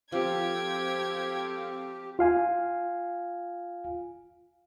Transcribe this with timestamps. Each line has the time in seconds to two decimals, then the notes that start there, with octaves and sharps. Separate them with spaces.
0.12 F3 C4 G4 A4 F5 G5 G#6
2.19 F4 F5 G#5